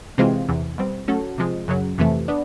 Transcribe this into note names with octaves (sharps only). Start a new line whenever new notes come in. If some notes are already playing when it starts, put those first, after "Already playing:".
C3 E3 G#3 C4 F4
E2 C3 E3
B2 G3 C4
F#3 A3 C#4 F#4 A4
C3 F3 G#3
F#2 C#3 F#3
F2 C3 E3 A3
B3 D4